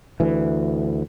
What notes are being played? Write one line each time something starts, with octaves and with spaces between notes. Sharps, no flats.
D2 E3